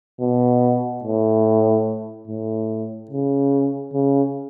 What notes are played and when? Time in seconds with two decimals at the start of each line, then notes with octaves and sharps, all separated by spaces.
0.20 B2
1.04 A2
2.27 A2
3.11 C#3
3.93 C#3